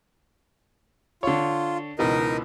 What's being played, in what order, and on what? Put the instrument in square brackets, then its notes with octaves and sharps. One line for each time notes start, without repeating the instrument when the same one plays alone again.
[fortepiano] D3 C#5 [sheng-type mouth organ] F4
[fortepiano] C#2 B2 E3 [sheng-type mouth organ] D#4 A#4 D#5